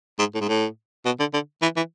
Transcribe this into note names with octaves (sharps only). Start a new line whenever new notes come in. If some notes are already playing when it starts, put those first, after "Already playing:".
G#2
A2
G#2
A2
B2
D3
D3
E3
E3